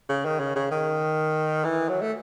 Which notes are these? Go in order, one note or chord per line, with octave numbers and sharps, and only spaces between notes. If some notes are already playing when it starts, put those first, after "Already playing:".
C#3
D#3
C#3
C#3
D#3
E3
F#3
A3